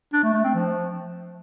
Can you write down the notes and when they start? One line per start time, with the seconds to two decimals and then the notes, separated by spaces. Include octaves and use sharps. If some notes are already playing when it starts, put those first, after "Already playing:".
0.13 D4
0.23 A3
0.34 A3
0.44 C4
0.54 F3